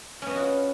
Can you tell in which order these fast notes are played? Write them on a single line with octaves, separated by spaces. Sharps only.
C#4 B3 D#5 F#4 F4